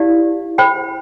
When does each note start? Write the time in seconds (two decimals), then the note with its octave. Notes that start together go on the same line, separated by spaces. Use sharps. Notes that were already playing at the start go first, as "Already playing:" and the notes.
Already playing: E4 G4 D5 F5
0.58 C5 G5 B5